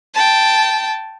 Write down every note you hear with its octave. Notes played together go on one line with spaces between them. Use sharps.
G5 A5